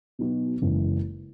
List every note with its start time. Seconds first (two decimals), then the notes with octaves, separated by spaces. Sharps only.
0.19 B2 F#3 B3 D#4 F#4
0.62 F#1 F#2 C#3 E3 G#3